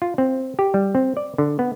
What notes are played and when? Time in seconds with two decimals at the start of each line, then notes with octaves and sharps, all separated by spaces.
0.02 F4
0.18 C4
0.59 G4
0.74 G3
0.95 C4
1.17 D5
1.38 D3
1.59 B3